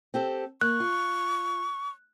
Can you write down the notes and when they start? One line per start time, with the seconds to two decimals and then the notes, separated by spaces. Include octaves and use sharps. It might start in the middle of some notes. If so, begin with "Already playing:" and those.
0.14 C4 G4 A4
0.61 A#3 C#6 F#6
0.80 F4